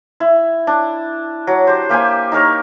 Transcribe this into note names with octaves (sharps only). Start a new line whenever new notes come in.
E4
D4
F#3
G4 C5
A#3 G4 C5 G#5
D#4 G4 A#4 C#5